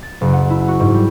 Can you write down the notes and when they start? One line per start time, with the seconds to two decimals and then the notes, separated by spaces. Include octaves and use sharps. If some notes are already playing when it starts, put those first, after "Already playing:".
0.03 A6
0.21 F#1
0.33 F#5
0.50 E4
0.68 F#4
0.80 G#2
0.94 G3